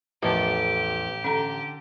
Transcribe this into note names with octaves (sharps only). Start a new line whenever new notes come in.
A1 E2 F3 G4 A4 A#4 A5
D3 C#4 A4 A#5